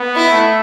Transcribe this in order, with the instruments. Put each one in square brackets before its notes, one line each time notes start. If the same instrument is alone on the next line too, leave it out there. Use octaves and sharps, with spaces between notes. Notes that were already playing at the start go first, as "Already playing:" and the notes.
Already playing: [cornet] B3
[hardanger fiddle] E4
[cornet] A3